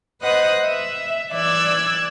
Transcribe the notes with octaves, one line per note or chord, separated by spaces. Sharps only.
B4 C5 D#5 F#5 D#6 F#6
E5
E3 D5 D6 E6 F#6 G#6